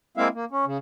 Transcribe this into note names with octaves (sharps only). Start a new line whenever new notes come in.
G#3 A#3 C4 E4 E5 F5
A#3
C#4
C#3